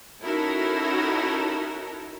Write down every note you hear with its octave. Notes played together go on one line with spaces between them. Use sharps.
C#4 D#4 E4 F#4 A4 A#4